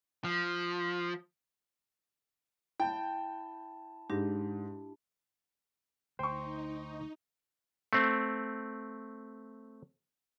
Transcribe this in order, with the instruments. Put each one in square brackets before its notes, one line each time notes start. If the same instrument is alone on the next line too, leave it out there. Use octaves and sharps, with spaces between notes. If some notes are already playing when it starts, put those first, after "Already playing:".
[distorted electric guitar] F3
[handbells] E4 A5 [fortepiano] G5
[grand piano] G#2 [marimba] D4 G4 A#6
[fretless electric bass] D2 [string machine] D#4 [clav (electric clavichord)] C5 [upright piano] G5 C#6
[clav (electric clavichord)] A3 C4